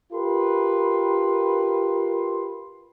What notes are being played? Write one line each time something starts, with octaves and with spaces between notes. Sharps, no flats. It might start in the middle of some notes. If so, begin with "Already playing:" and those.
F4 G4 A#4 B4 C6